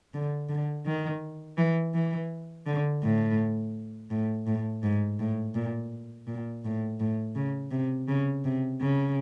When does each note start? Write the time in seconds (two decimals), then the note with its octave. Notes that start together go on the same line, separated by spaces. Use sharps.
0.14 D3
0.49 D3
0.86 D#3
1.58 E3
1.94 E3
2.66 D3
3.03 A2
4.10 A2
4.47 A2
4.83 G#2
5.19 A2
5.55 A#2
6.27 A#2
6.64 A2
7.00 A2
7.36 C#3
7.72 C3
8.08 C#3
8.44 C3
8.81 C#3